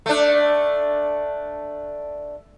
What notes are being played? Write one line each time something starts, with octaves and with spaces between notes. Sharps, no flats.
A3 D4